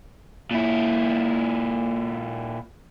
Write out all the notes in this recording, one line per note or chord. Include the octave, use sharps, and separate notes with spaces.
A#2 E4